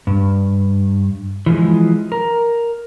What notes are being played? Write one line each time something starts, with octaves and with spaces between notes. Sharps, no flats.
G2
E3 F3 G3 G#3
A#4